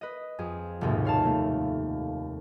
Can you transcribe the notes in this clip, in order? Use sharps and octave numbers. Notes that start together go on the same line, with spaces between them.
B4 D#5
F2 G#4
F1 A#1 D#2 G#2 B2
C#5 F5 A5
A3 A#3